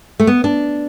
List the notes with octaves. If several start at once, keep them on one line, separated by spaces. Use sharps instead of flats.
A3
B3
D4